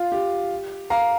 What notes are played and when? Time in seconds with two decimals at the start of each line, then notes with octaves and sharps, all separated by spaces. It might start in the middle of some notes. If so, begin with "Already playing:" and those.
Already playing: F4
0.12 G4
0.90 F5 A#5